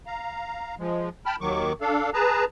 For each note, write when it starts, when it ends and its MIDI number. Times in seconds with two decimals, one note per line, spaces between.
0.06 0.75 77
0.06 0.75 82
0.79 1.09 53
0.79 1.09 56
1.26 1.36 79
1.26 1.36 81
1.26 1.36 83
1.26 1.36 89
1.41 1.73 39
1.41 1.73 51
1.41 1.73 54
1.41 1.73 85
1.41 1.73 86
1.81 2.10 62
1.81 2.10 69
1.81 2.10 77
2.14 2.45 68
2.14 2.45 71
2.14 2.45 81
2.14 2.45 82